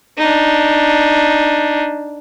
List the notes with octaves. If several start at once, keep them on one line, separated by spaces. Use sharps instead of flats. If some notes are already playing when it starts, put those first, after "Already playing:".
D4 D#4